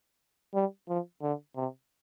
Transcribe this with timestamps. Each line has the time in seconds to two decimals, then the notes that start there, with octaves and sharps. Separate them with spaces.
0.54 G3
0.89 F3
1.22 D3
1.56 C3